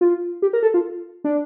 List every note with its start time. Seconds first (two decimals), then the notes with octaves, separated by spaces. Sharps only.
0.01 F4
0.42 G4
0.53 A#4
0.63 A4
0.74 F4
1.24 D4